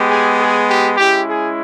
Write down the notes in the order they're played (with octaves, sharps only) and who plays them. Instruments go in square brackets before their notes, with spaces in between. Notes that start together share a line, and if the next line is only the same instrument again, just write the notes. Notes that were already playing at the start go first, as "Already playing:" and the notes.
Already playing: [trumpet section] G#3 B3 G4
G#4
G#4
G4
G#3 C#4 E4 G4
G#4